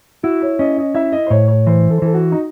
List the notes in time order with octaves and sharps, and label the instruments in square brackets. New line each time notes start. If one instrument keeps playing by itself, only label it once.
[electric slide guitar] E4 [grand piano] F#4
[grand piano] C#5
[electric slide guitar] C#4 [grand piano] D#5
[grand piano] D#5
[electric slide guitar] E4 [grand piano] E5
[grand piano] D#5
C5
[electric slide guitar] A2 [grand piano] C#5
[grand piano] C#5
[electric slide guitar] E3 [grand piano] C5
[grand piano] A4
C5
[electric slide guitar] E3 [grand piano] A4
[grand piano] F#4
D#4